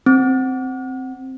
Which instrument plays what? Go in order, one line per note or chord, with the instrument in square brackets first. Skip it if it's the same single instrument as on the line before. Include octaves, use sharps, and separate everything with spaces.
[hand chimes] C4